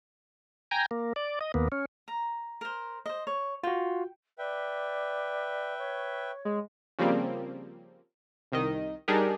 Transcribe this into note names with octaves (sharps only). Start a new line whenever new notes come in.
G5 G#5 A#5
A#3
D5
D#5
D#2 A#3 B3
C#4
A#5
A#4 C5
C5 D#5
C#5
F4 F#4 G5
B4 D5 E5 G5
C#5
G#3
C#3 F3 G3 A#3 C4
C2 D#3 D#5
G3 D4 D#4 G4 G#4 A#4